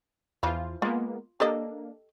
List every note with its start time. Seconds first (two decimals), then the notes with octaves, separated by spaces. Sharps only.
0.43 E2 E3 F3 F4 B5
0.82 G#3 A#3 B3 F4
1.40 A#3 D4 G4 A4 D#5